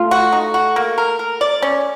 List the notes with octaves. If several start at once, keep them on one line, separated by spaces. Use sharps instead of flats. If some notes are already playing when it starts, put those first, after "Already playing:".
Already playing: A3 F4
F#4
D#4
F#4
A#3
A#4
A#4
D5
C#4